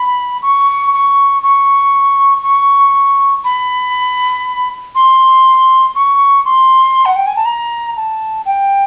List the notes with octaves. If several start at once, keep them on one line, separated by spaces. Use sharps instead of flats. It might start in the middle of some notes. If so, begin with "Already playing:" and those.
Already playing: B5
C#6
C#6
C#6
C#6
B5
C6
C#6
C6
F#5
G5
G#5
A5
A#5
A5
G5